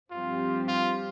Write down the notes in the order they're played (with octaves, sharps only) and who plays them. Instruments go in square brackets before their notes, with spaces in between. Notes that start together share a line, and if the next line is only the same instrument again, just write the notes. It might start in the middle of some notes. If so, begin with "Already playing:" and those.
[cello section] G2 F3 C4 G4 [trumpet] F4
[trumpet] F4